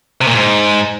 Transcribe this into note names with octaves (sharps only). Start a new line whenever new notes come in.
C3
A#2
G#2